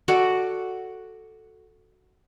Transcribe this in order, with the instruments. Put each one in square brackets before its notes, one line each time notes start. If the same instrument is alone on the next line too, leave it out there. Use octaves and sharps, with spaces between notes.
[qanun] F#4 A4 D5 F#5